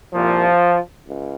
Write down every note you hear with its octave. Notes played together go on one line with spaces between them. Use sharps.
C2 A#2 F3
C#2